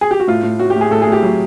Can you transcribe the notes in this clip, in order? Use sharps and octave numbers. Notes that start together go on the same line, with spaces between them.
G#4
G4
F#4
A2 F4
A2
A2 F#4
G4
A2 G#4
A2 A4
A2 G#4
G4
F#3